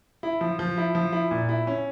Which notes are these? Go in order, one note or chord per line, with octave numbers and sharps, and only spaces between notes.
E4
F3
F3
E4
F3
E4
A#2
E4
C#4